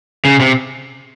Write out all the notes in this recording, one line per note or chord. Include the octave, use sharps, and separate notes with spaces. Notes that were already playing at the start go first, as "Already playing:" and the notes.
C#3
C3